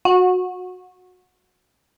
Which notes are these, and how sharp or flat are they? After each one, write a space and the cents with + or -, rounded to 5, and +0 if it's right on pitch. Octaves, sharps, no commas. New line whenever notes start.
F#4 -25